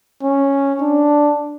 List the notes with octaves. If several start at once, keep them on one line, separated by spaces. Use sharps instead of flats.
C#4
D4